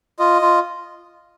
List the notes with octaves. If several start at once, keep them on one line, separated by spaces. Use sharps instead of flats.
F4 D#5
F4